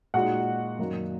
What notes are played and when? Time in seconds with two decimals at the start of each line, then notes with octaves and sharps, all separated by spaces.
0.14 A#2 G#3 D#4 F#4 F#5
0.79 F#2 D#3 F#3 A#3 D#4